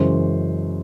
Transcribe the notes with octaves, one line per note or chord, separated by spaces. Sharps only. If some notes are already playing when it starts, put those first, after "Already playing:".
Already playing: F#2 C#3 E3 G#3 C5